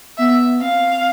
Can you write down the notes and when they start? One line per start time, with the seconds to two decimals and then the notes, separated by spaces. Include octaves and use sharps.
0.18 B3 E5
0.61 C4 F5